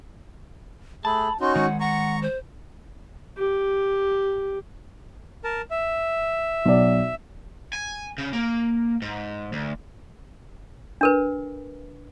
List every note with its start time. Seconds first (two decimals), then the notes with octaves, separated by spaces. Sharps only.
1.05 A3 G#4 A5 B5
1.41 C#4 D#4 F#4 C6
1.56 D#3 G#3 F#5
1.80 F#5 A#5 C#6
2.22 C5
3.38 G4
5.44 A#4 A5
5.71 E5
6.65 B1 D5
7.73 G#5
8.18 C#3
8.33 A#3
9.02 G#2
9.53 D2
11.01 D4 A#4 B4